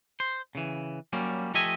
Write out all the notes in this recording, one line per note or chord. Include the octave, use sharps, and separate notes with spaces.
C5
C#3 E3
F#3 G3 A#3 C#4
F3 A3 G4 D#5 E5 G#5